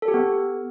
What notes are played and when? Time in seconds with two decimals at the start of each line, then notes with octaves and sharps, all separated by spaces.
0.02 A4
0.08 G4
0.14 B3